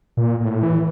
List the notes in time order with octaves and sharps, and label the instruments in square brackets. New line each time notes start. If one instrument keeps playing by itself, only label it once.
[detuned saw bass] A#2
A#2
A2
E3